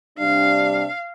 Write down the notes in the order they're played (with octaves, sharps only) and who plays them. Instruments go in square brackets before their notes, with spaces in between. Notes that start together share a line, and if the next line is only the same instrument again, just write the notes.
[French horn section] C3 G3 D4 [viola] F5